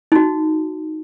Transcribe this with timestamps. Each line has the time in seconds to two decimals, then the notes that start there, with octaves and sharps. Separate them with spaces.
0.12 D#4 F#4